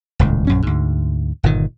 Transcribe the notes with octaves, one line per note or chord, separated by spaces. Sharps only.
D#1 C#2 A2
A#1 F#2 C#4
D2 G#2
G1 A#2 D#3